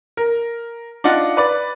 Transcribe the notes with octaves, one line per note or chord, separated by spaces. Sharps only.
A#4
D4 D#4 F4 F#5
B4 D5